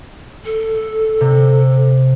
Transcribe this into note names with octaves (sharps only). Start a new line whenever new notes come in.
A4
C3